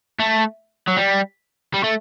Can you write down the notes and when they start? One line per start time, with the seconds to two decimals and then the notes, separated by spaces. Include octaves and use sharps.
0.19 A3
0.88 F#3
0.97 G3
1.74 G3
1.84 A3